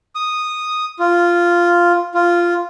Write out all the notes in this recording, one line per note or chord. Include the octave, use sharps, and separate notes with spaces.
D#6
F4
F4